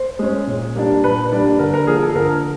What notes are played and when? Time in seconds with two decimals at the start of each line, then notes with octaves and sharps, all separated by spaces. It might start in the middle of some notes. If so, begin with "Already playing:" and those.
Already playing: C5
0.19 G#3 C#4
0.47 A#2
0.75 G3 A#3 D4
1.03 A#2 B4
1.32 G3 A#3 D4
1.59 D3 A#4
1.73 A#4
1.87 F3 A#3 G#4
2.02 A4
2.15 D3 A#4